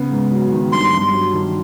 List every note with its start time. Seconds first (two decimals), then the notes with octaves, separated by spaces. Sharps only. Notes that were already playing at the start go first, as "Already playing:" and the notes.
Already playing: C#3 B3
0.11 G#2
0.32 F#3
0.52 D#3
0.72 G2 C6
0.93 G2
1.13 F#3
1.34 D#3